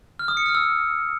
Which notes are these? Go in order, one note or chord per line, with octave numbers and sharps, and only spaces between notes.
F6
D#6
C#7
F6
E6